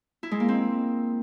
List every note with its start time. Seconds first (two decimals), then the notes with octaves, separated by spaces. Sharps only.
0.23 E4
0.31 G#3
0.40 A#3
0.48 C4